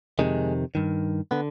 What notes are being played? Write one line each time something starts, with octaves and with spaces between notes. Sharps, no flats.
F2 C3 D#3 G#3
G2 D#3
D3 B3